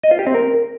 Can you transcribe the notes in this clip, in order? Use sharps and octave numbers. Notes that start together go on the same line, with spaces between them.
D#5
F4
G4
C4
A#4